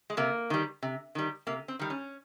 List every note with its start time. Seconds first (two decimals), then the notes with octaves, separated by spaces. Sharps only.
0.10 G#3
0.17 C3 A#3
0.50 D#3 G3
0.83 C3
1.15 D#3 G3
1.47 C3 A#3
1.68 C4
1.79 D#3 G3
1.90 C#4